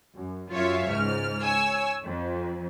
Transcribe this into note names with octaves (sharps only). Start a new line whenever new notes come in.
F#2
F#2 F4 C#5 E5 F5
C#2 G#2 F6
C#5 G#5 E6
F2